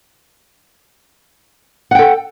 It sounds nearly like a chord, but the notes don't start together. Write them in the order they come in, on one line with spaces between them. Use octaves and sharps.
F#5 G5 A4